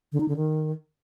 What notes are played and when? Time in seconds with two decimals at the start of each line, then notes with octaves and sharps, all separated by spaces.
0.12 D3
0.20 D#4
0.28 D3
0.36 D#3